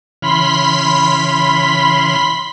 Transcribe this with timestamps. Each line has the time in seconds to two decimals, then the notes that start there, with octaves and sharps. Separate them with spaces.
0.22 C#3 E3 B5 C6 F6 B6